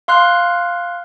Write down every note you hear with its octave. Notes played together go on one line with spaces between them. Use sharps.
F5 C6 F6 F#6